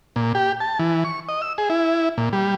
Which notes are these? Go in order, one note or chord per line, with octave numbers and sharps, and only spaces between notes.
A#2
G4
A5
E3
C#6
D#5
E6
G#4
E4
A#2
G3